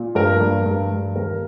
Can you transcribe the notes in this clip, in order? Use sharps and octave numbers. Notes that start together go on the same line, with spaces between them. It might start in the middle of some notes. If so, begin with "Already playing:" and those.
Already playing: A#2
G2 A#4
G2
G2
G2
D#2 A#4